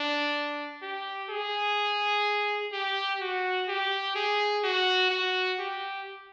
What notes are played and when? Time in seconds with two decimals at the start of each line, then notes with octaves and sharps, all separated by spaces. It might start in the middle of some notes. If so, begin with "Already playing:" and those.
Already playing: D4
0.82 G4
1.30 G#4
2.72 G4
3.21 F#4
3.68 G4
4.15 G#4
4.64 F#4
5.11 F#4
5.59 G4